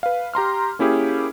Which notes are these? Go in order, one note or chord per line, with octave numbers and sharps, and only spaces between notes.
B4 F5
G4 A#5 C6 F6
A#3 C#4 E4 G4 G#4